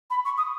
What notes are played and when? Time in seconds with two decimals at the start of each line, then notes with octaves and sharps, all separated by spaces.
0.10 B5
0.24 C#6
0.37 D#6